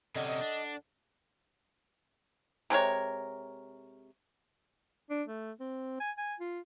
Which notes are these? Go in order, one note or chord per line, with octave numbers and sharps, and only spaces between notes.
C3 C#4 A4 D5 D#5 F#5
D#5
D4
C3 G#3 A#4 C#5
D4
A3
C4
G#5
G#5
F4